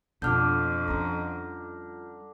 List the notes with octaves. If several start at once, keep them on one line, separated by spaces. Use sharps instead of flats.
F2 B2 D3 D4 F4 D6 F6 G6
G3 C#4 A#5